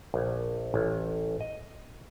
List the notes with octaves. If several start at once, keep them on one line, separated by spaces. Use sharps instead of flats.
A#1
A1
D#5